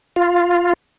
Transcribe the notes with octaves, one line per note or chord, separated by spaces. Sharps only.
F4